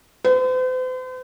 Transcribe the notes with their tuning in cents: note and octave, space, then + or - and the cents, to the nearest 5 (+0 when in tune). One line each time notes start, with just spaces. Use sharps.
C5 -45